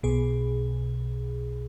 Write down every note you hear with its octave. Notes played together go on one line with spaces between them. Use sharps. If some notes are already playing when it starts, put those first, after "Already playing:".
B1 B2 G#4